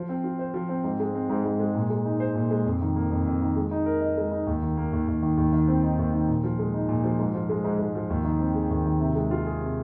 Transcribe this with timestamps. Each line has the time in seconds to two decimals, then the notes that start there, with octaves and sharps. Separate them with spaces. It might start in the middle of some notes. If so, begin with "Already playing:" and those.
Already playing: F3
0.09 C4
0.24 F4
0.39 C5
0.54 F3
0.69 C4
0.84 G#2
1.00 G#3
1.15 C4
1.30 G#2
1.45 G#2
1.60 G#3
1.75 A#2
1.90 G#3
2.05 D#4
2.20 C5
2.35 A#2
2.50 G#3
2.66 F2
2.81 D#3
2.96 A#3
3.11 F2
3.26 F2
3.41 D#3
3.56 G#3
3.71 D#4
3.86 A#4
4.01 D#5
4.17 G#3
4.32 D#4
4.47 D#2
4.63 D#3
4.77 A#3
4.93 D#2
5.08 D#2
5.22 D#3
5.37 D#2
5.53 D#3
5.68 C4
5.83 D#4
5.99 D#2
6.13 D#3
6.28 A#2
6.44 F3
6.59 G#3
6.74 D#4
6.89 A#2
7.04 F3
7.19 G#2
7.34 F3
7.49 G#3
7.64 G#2
7.79 G#2
7.95 F3
8.10 D#2
8.25 D#3
8.40 C4
8.55 G#4
8.70 D#2
8.86 D#3
9.00 C3
9.15 G#3
9.31 F4
9.46 G#4
9.61 C3